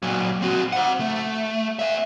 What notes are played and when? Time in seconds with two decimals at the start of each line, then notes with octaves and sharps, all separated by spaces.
0.02 A#2 F#3
0.42 C4 F#4
0.72 C5 F#5
1.00 A3
1.79 B3 E5